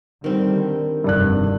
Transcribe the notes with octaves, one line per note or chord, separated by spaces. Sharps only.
D3 D#3 G3 C4
F1 G2 D3 D5 F#6